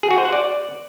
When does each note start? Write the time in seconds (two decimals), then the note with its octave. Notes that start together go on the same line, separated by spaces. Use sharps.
0.03 G#4
0.11 F#4
0.18 C5
0.25 F#5
0.32 D5